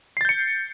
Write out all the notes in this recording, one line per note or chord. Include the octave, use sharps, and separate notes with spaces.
G6 A6 C7 C#7